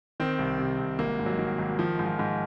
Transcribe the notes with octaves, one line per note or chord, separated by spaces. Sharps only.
D#3 C4
C2
C3
C2
G#1 A#3
G#2
F#3
D#3
G#1
D#3 F3
G#2
F3
G#2